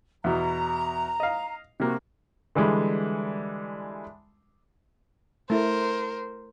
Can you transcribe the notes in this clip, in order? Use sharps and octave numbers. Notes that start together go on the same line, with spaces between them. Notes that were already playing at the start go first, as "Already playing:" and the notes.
E2 B2 A#5
D#5 F5
C3 A#3 F#4
D3 E3 G3 G#3
A3 E4 A#4 C5